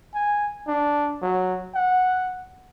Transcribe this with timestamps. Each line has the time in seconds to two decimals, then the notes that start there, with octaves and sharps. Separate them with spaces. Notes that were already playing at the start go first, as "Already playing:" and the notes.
0.14 G#5
0.67 D4
1.22 F#3
1.75 F#5